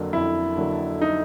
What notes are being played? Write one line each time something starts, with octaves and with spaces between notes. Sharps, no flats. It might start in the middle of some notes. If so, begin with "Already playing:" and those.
Already playing: F2 D3 F#3 A#3
F2 E4
D3 F#3 A#3
D#4